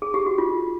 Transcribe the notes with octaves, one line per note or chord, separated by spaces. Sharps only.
G#4
G4
F#4
F4